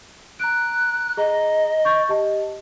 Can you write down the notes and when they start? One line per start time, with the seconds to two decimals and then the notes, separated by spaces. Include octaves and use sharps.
0.40 A#5 F#6 D7
1.17 G#4 D#5 A#5
1.85 C#6 G6 A6
2.09 G4 D#5 A5